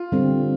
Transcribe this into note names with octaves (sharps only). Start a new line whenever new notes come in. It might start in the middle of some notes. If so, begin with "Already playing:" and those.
Already playing: F4
D3 G3 C4